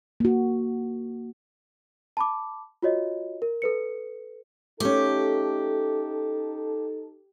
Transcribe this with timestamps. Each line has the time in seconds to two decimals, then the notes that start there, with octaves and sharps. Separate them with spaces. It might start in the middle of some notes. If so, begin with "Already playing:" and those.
0.20 A#3 F#4
2.17 A5 B5 D6
2.82 F4 F#4 C#5 D#5
3.42 A#4
3.62 A4 B4 C#7
4.80 A3 C#4 D#4 G4 A4